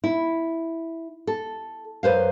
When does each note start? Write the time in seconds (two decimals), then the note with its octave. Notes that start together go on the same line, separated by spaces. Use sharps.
0.04 E4
1.27 A4
2.03 F#2 B4 C5 F5